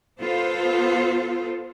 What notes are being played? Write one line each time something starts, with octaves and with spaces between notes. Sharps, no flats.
B3 F4 A4 C5